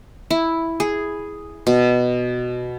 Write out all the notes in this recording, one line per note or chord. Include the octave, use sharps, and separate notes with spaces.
E4
G#4
B2